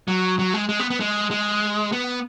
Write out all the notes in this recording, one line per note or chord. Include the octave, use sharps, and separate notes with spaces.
F#3
F#3
G#3
G#3
B3
B3
G#3
G#3
B3